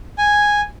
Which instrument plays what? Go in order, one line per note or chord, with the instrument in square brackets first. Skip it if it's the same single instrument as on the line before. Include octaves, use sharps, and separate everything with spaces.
[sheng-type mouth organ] G#5